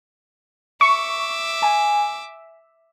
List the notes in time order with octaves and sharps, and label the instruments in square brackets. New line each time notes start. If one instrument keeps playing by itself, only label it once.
[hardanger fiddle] E5 D6 [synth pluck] C#6
[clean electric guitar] G#5